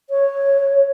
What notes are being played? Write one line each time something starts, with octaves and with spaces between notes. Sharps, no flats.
C#5